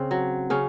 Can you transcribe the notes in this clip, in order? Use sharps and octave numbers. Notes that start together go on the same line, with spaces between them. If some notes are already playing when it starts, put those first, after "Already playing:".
Already playing: C#3 C4
F#3
C#3 C#4